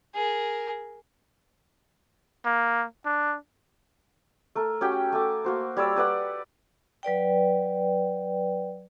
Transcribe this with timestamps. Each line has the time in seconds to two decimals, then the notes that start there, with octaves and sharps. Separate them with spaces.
0.15 G#4 A#4
2.45 A#3
3.06 D4
4.55 A3 A#4
4.81 C#4 F#4 G4 G5
5.12 A3 G#5 D6
5.44 A#3 F#4 C5
5.77 G3 C#5 D5 E6
5.96 G4 B4 D5 F#5
7.03 F#3 B4 D5 G5